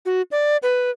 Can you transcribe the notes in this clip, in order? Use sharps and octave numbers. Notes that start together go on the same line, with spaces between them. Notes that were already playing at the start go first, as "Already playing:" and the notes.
F#4
D5
B4